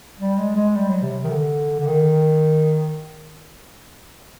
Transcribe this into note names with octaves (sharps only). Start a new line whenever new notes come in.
G3
G#3
G#3
G3
F#3
C3
D#3
D3
D3
D#3